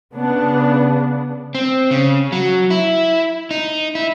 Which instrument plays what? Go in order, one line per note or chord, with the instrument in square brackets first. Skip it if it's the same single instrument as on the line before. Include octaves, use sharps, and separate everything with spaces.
[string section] C#3 B3 D4
[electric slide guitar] C4
C#3
F#3
E4
D#4
E4